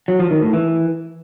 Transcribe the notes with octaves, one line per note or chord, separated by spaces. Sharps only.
F#3
F3
D#3
A2
E3